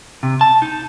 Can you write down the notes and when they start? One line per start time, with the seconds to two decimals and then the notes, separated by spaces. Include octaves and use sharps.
0.23 C3
0.41 A5
0.62 D#4